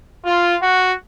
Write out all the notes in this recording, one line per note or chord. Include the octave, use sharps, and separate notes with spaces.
F4
F#4